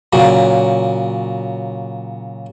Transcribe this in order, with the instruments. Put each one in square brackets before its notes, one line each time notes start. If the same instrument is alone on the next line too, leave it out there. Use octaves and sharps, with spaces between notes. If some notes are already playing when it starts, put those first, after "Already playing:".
[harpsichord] A#2 C#3 F#3